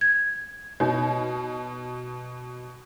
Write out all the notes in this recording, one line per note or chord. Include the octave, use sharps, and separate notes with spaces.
G#6
B2 D#4 C#5